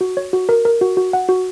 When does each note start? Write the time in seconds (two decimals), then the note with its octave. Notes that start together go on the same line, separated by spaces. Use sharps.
0.01 F#4
0.17 C#5
0.33 F#4
0.49 A#4
0.65 A#4
0.81 F#4
0.97 F#4
1.13 F#5
1.28 F#4